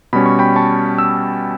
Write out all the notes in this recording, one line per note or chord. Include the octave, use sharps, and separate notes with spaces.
B2 G3 C#4 B5
C#6
G5 B5
A5 C#6
E6